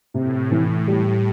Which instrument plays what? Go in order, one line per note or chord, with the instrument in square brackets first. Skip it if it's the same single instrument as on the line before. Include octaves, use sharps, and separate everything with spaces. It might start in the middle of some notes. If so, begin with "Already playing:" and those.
[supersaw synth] A2 [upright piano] C3
[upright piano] E3
G3